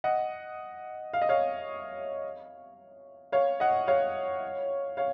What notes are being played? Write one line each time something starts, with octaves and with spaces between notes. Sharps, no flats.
D#5 F#5
F5
D#5
C#5 F5
C#5 F5
D#5 F#5
C#5 F5
C#5 F5